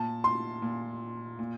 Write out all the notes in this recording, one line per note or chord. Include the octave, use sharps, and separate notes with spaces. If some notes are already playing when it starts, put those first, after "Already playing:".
Already playing: A#2 A5
C6
A#2
A#2